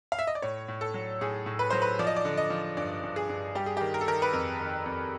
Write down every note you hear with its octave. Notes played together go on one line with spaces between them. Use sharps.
F5
E5
D#5
D5
A2 C#5
A2
A4
F#3
A2 G#4
A2
B4
F#3 C5
B4
F3 D5
D#5
D5
D3
D#5
F3
G2 D5
G2
G#4
G2
G3 G4
G#4
D#3 G4
A#4
A4
D#3 A#4
B4
F2 A#4
D#3
F2